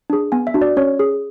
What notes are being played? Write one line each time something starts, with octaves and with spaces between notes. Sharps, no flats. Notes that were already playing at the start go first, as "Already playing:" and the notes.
D4 G#4
B3 G#5
E5
D4 F#4
D5
C#4 C#5
G#4